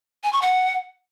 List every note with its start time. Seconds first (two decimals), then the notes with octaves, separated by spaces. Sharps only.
0.24 G#5
0.33 C#6
0.42 F#5